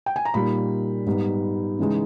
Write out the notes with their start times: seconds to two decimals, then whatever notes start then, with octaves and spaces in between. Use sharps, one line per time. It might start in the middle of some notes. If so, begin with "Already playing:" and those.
0.06 G5
0.16 G#5
0.25 A#5
0.34 A#2 G3 A#3 D#4 B5
1.06 G#2 G3 B3 D#4
1.79 C#3 E3 G#3 D#4